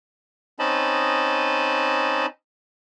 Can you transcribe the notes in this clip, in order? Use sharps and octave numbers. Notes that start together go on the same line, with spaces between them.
C4 C#4 D#4 D#5 A5 B5